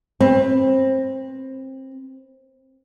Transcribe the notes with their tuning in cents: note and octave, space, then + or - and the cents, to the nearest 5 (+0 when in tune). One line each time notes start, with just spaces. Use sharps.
C4 +20 B4 +0